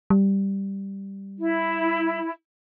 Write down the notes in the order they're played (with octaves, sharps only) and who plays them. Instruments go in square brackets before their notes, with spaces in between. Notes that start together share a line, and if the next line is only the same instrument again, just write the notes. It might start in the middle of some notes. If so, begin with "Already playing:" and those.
[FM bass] G3
[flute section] E4